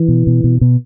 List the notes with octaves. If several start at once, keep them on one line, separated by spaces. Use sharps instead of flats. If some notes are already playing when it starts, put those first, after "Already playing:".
Already playing: E3
B2
B2
B2
B2